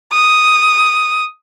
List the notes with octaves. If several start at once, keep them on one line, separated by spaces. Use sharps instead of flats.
D#6